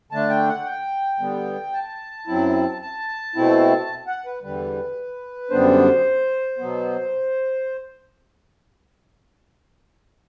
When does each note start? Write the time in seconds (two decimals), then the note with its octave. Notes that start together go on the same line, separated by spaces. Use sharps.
0.12 D3 A3 D4 A5
0.29 G5
0.48 F#5
0.66 G5
1.19 D3 G3 B3
1.73 A5
2.27 F#2 F#3 C4 E4
2.82 A5
3.36 B2 A3 C4 E4
4.07 F#5
4.26 B4
4.42 E2 D3 G3 B4
5.50 F#2 D3 G3 B3 D4 C5
6.58 B2 F#3 B3